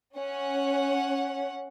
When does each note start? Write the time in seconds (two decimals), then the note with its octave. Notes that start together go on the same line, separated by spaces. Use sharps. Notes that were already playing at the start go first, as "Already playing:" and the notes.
0.17 C#4 F#5